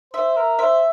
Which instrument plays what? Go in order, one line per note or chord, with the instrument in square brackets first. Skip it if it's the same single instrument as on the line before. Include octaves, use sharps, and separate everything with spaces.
[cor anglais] C5 [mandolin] E5
[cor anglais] A#4
[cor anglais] C5 [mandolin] E5